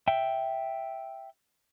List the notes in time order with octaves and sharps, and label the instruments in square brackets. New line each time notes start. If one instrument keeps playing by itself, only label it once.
[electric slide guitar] E5 G5